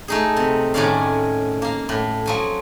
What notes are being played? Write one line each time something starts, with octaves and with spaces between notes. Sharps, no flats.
A3 D#4 G#4
C3
A2 D#3 C#4 C#5 D5 F5
A#3 F5
A2
F3 F#3 G#5